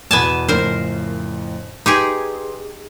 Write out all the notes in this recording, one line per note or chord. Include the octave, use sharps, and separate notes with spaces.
E2 B2 B3 G#5 A5
F2 A2 C#3 A#4 C5
D#4 G4 G#4 B4 C6